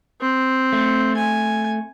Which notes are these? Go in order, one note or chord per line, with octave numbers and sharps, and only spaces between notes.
C4
A3
G#5